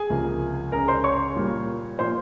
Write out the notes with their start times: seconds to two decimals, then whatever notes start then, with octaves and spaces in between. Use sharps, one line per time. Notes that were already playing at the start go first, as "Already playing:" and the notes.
Already playing: G#4 G#5
0.10 C#2 C3 F3 A#3
0.72 C#2 C#3 G#3 A#4 A#5
0.88 C5 C6
1.04 C#5 C#6
1.36 A#2 G3 A#3
1.99 A#2 F3 A#3 C5 C6